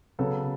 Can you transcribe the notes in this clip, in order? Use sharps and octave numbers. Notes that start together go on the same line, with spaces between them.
C#3 F#3 B3 A4